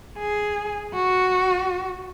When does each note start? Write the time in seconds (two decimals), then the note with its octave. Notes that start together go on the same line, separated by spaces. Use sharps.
0.18 G#4
0.94 F#4